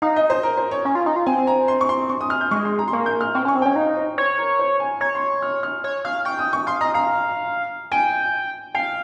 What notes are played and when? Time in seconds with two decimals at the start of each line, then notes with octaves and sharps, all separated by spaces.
0.02 D#4 F5
0.16 D#5
0.30 C5
0.43 A#4
0.57 C5
0.71 C#5
0.85 C#4
0.95 F4
1.06 D#4
1.16 F4
1.26 C4 G#5
1.47 A#5
1.68 C6
1.81 C#6
1.89 C6
2.09 C#6
2.21 D#6
2.30 F6
2.41 G6
2.51 G#3 C#6
2.65 C6
2.79 A#5
2.88 C6
2.93 A#3 C#6
3.06 G6
3.21 F6
3.35 C4 C#6
3.45 C#4
3.48 C#6
3.55 C4
3.62 G5
3.66 C#4
3.76 D#4 F5
3.97 C5
4.18 C5 C#5
4.38 A#4
4.59 C5
4.80 G#5
5.00 C#5 A#5
5.15 C6
5.42 F6
5.63 F6
5.84 C#5
6.05 F5 F6
6.25 G5 C#6
6.39 D#6
6.53 C#6
6.67 F5 C6
6.81 D#5 A#5
6.94 F5 A#5
7.92 G5 G#5
8.74 F5 G5